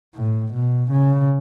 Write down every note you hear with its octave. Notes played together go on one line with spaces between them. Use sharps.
A2
B2
C#3